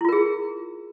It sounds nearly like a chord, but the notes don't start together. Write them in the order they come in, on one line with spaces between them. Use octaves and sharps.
E4 F4 A#4 G#4